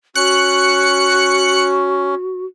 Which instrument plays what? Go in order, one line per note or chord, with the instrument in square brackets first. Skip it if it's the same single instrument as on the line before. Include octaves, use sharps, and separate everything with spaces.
[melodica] C#4 [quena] F#4 [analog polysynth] F#6 C#7